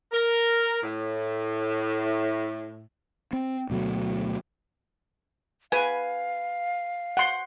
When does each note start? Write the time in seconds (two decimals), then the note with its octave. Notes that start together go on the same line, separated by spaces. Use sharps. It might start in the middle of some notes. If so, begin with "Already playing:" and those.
0.12 A#4
0.83 A2
3.33 C4
3.70 D2 B2 F#3 A3
5.72 B4 F5 G#5
7.17 F#5 C6